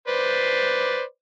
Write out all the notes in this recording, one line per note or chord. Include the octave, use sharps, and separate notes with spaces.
B4 C5 D5